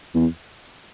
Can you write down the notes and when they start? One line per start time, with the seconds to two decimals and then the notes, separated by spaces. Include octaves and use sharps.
0.14 E2